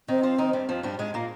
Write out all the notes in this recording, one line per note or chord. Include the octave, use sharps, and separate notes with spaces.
D#3 C4 D#4
F3 F4
D#3 D#4
G2 G3
F2 F3
G2 G3
G#2 G#3
A#2 A#3